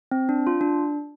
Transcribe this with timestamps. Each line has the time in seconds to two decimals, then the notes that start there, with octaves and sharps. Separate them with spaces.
0.11 C4
0.29 D4
0.47 F4
0.61 D4